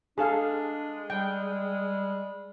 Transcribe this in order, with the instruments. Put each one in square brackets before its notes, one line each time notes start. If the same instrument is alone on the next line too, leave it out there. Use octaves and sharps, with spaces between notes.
[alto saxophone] G#3 [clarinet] D4 [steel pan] G#4 A4 F5
[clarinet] G3 [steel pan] G5